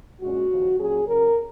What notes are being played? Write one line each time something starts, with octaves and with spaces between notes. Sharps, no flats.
A#2 G#3 C#4 F#4
D#2 C#3 F3
A#2 F#3 C#4 G#4
C#3 F#3 C#4 A#4